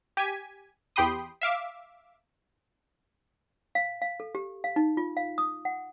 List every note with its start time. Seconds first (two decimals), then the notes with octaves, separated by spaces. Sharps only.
0.17 G4 G#5 B6
0.96 E2 G4 G5 B5 C6 D#6
1.41 E5 F5 D6
3.75 F5
4.02 F5
4.20 A4
4.35 G4
4.64 F5
4.76 D#4
4.97 F4
5.17 F5
5.38 D#6
5.65 F#5